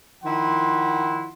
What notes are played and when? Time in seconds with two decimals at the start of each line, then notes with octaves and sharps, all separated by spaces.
0.23 D#3 F3 E4 F#5 C6